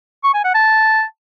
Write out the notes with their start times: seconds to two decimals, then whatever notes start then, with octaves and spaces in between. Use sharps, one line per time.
0.24 C#6
0.34 G#5
0.44 F#5
0.54 A5